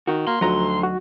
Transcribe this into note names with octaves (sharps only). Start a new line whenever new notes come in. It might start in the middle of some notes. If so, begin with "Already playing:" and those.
D#3 F#4
A#3 C6
D2 F3 F#3 D#4 A#5
F#4